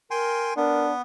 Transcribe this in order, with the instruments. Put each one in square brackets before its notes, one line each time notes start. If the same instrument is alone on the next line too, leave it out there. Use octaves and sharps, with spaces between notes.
[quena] A#4 [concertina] G5 G#5 C6
[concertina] B3 [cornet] D4 [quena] A#4